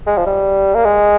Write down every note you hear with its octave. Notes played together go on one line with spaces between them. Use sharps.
G#3
F3
G3
A#3
G#3